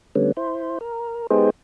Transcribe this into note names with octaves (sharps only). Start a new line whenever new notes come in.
D3 G3 A3 B3 C#4
E4 C5
A#4
G#3 B3 D#4 G4 G#4 C5